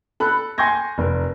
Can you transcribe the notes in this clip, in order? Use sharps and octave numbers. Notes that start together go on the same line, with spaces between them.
A4 B5 F#6
G#5 C6 C#6 G6 G#6 A#6
F1 A#4